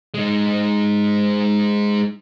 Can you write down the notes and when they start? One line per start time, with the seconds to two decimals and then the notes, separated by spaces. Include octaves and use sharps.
0.14 G#3 D#4